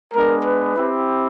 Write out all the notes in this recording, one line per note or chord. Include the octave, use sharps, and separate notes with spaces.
G#3 B3 D4 A#4
B4
C4 E4 G4